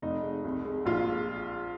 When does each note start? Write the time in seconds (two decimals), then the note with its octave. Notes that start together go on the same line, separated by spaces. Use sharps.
0.02 F1 D#4
0.23 G#3
0.44 C2
0.65 G#3
0.86 A#1 F4
1.07 G#3